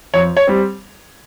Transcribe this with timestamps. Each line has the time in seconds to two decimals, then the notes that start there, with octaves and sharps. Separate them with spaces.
0.14 F2 C#5
0.37 C#5
0.47 G3 C4